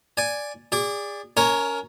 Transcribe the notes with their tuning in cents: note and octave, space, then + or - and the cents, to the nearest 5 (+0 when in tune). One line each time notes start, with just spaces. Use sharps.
D5 +0 G#5 +0
G#4 -30 D5 -5
C#4 +25 A#4 +0 C#5 +0